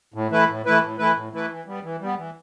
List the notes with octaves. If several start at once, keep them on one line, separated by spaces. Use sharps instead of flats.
A2
E3 A3 E4 B4
A2
E3 A3 E4 B4
A2
E3 A3 E4 B4
A2
E3 A3 E4 B4
E3
G3 B3
E3
G3 B3
E3